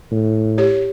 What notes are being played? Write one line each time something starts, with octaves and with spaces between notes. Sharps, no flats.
A2
G4 C#5